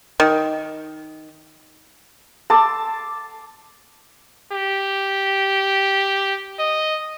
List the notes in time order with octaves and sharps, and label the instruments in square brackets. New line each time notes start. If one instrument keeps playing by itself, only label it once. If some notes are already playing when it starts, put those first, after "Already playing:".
[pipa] D#3
[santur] A5 C6 D6 E6
[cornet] G4
D#5